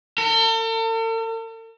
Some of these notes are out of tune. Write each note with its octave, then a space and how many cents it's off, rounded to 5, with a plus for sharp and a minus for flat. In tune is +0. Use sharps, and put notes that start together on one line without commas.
A4 +45